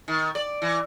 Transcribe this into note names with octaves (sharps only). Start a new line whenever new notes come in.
D#3
D5
E3